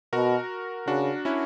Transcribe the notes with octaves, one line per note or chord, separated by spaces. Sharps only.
B2 F#4 A#4
C#3 D4 F#4
C#4 E4